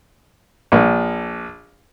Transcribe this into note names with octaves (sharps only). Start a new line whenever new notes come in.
A#1